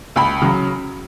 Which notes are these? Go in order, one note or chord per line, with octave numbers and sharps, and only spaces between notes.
C#2 B5
C#3 F#3